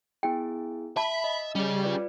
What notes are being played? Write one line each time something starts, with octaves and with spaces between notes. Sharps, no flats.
B3 E4 G#4 G5
E5 A5 B5
D#5
G3 C#4 G#4
F4 B4 D5